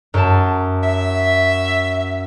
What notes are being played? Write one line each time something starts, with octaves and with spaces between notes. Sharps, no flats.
F#2 A5
E5